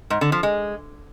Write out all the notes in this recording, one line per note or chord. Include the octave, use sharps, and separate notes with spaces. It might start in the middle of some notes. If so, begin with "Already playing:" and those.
G#2
D3
F3
G#3